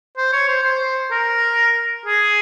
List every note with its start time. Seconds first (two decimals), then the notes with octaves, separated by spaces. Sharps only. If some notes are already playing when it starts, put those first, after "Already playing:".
0.17 C5
0.33 C#5
0.48 C5
0.64 C5
1.11 A#4
2.06 G#4